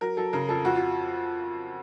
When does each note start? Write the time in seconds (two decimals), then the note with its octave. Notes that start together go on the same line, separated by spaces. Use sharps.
0.01 F#3 A#4
0.17 F#3 A4
0.33 C#3 A#4
0.49 F2 A4
0.65 F2 F#4
0.75 F4